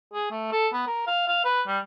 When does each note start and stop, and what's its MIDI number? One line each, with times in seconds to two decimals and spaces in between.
0.14 0.30 68
0.31 0.50 57
0.52 0.68 69
0.73 0.82 59
0.87 1.04 70
1.07 1.27 77
1.28 1.45 77
1.45 1.62 71
1.67 1.79 55